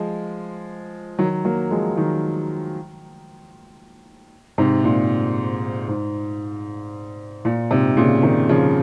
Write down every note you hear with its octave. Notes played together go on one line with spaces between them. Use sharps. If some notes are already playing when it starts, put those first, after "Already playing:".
Already playing: F3 G#3
D#3 F#3
F#3 A#3
F3 G#3
D#3 F#3
G#2 C3
A#2
G#2
A#2
G#2 C3
A#2 C#3
C3 D#3
C#3 F3